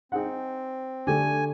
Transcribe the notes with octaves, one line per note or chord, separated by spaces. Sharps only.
C4 D#4 G#4 F#5
D3 A3 D4 G4 G#5